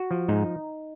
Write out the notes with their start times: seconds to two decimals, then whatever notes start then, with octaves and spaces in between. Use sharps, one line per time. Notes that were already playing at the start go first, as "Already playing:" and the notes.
Already playing: F#4
0.11 F3
0.28 G#2 D#4